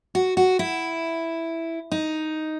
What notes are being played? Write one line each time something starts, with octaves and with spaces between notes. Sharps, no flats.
F#4
F#4
E4
D#4